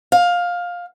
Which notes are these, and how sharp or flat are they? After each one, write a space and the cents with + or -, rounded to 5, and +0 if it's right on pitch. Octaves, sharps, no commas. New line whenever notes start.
F5 +15